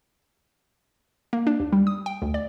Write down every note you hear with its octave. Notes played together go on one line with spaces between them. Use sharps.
A#3
D4
D#2
G3
D#6
G5
D2
D5